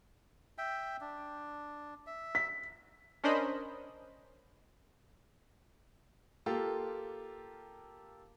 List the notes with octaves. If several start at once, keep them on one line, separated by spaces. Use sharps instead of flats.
E5 G5
D4
E5
B6
C#4 D4 A#4 C5 D#5 B5
A#3 F4 G4 A4